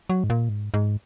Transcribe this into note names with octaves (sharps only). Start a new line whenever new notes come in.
F#3
G#2
A#2
G#2
G#2